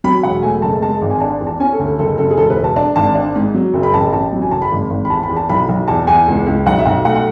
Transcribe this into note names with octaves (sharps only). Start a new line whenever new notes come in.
F#3 B5
E1 F#5
A3 G#5
F#1 A5
G#3 A5
G#1
G#5
D4 A5
E2
A5
C#4 G#5
A4
D2
A4
F#1 A4
F#1 A4
G#4
E1 A4
B4
E1
A5
D4 A5
G#1 A5
D4
G#2
F#3
F#1
B5
A1 A5
A1 A5
F#3
G#5
F#1 A5
B5
G#1
G#1
B5
E2 A5
B5
E2
A5
B1 B5
B1
E2 A5
E2 G#5
C#2
C#2
B1 F#5
E5
B1 F#5
A3 F#5
F#5